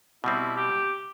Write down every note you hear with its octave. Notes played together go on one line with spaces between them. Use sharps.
B2 G3 C4 E4
G4